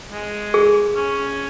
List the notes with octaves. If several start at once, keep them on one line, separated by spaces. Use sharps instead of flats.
G#3
G#4
C#4